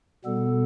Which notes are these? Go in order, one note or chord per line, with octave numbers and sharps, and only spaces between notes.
B2 G3 B3 A4